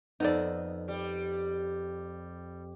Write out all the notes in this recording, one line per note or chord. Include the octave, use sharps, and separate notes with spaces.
F2 B3 D#4 A4 D5
G3